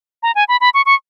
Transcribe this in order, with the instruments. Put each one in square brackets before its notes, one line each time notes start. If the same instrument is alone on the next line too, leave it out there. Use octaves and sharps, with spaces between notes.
[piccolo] A#5
G#5
B5
B5
C#6
C#6